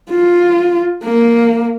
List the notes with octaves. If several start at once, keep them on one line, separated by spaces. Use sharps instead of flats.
F4
A#3